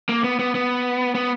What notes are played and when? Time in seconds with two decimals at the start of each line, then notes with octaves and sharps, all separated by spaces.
0.09 A#3
0.24 B3
0.39 B3
0.55 B3
1.15 B3